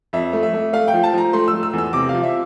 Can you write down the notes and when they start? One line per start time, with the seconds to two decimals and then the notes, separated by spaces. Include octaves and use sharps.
0.13 F2 E5
0.33 A3
0.43 E5
0.53 A3
0.73 A3 F5
0.88 G5
0.93 F3
1.03 A5
1.13 F3 A#5
1.33 A3 C6
1.48 E6
1.53 A3
1.63 E6
1.73 E2 E6
1.93 C3 D6
2.09 F3 F5
2.23 E5